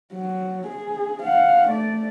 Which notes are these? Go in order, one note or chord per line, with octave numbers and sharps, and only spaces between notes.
F#3
G#4
F5 F#5
A3 D5